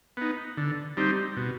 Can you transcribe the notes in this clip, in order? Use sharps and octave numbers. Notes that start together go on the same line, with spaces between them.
B3 D#4
D3
G3 C4 D#4
B2